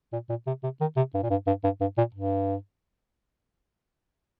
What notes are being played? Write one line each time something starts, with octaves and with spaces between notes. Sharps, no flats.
A#2
A#2
C3
C3
D#3
C3
G2
A#2
G2
G2
G2
G2
A#2
G2